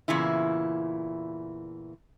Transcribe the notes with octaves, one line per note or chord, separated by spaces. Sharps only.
E2 A#2 C#3 E3 E4